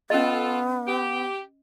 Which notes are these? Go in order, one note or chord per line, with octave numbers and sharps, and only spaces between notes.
B3 C#4 F4 A4 D#5
G4